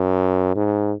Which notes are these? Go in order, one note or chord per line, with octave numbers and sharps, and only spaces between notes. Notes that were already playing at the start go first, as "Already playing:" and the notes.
Already playing: F#2
G#2